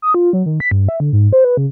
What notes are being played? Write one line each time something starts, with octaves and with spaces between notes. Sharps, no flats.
D#6
F4
F#3
D#3
B6
G2
E5
D3
G#2
C5
B4
C#3